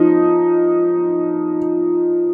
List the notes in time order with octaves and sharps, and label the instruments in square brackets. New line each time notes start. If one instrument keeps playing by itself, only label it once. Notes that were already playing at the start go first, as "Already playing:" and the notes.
Already playing: [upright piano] F3 D#4